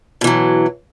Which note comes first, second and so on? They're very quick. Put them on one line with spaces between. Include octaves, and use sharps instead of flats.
B2 E3 F#3